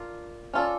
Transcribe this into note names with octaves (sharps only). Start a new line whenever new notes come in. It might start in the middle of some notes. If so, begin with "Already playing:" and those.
Already playing: D4 F4 A#4
C#4 F4 A4 D5